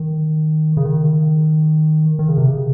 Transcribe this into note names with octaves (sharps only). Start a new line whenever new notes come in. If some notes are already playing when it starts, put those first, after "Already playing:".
Already playing: D#3
C#3
D#3
D#3
C#3
C3
C#3